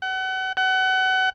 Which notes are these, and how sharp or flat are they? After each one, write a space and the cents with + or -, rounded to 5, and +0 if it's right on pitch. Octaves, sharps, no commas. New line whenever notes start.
F#5 +35
F#5 +30